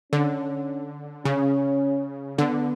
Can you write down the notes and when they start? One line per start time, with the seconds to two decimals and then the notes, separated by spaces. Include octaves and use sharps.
0.12 D3 C#4
1.25 C#3 C#4
2.38 D3 B3